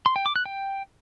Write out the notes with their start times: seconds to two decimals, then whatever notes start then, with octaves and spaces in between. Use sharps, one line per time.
0.06 C6
0.16 G5
0.26 D6
0.36 F#6
0.46 G5